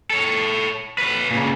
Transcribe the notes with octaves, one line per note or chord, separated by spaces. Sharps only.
A4 C#5
B4 C#5
A#2 C#3